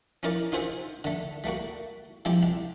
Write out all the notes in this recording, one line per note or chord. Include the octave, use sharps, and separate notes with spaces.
C#4 D#4 E4 A#4 D5 F5
D#4 F4 G#4 C5 E5 F#5
D3 A3
G3 A3 A#3 F#4
F3 G#3 C4 E4 G4
C2